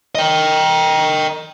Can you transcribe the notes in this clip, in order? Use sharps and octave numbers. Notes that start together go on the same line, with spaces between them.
D#5 G5